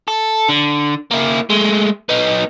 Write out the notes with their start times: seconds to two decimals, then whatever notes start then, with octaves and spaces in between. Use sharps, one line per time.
0.08 A4
0.49 D3
1.11 A#3 E4
1.50 G#3 A3
2.09 B3 D#4